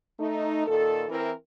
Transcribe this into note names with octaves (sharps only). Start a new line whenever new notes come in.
A3 D#4
A#2 D#3 A4
E3 C4 E4 A#4